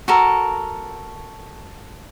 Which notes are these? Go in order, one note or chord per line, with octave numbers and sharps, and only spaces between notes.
F#4 A4 A#4